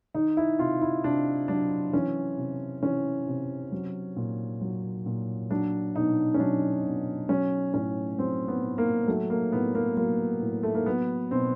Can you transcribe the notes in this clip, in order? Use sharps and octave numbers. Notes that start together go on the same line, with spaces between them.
D#3 D#4
E4
C3 F4
E4
C3 D4
F#3 D4
E3 C#4
C3
E3 C#4
C3
F#3
A#2
F#3
A#2
F#3 D4
B2 D#4
C#4
F#3 D4
B2
F#3 C#4
A2 C#4
F#3 C4
B3
A2
A#3
F#3 A3
A#3
A2 B3
A#3
F#3 A#3
A2
A3
A#3
F#3 B3
B2 C4